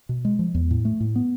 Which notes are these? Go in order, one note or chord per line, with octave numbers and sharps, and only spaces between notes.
B2
G#3
F3
E2
A2
A3
A2
B3